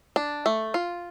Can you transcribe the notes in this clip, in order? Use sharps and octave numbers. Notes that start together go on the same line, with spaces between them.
D4
A3
F4